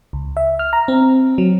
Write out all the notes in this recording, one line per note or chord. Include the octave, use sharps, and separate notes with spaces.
C#2
E5
F6
A#5
C4
F#3